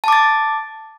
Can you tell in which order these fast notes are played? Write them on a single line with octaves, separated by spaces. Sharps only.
A5 D6 A6